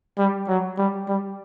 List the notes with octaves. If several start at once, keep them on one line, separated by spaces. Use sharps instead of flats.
G3
F#3
G3
G3